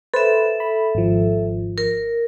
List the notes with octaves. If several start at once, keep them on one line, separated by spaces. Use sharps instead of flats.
A4 B4 C5 E5
B5
G#1 F3
A#4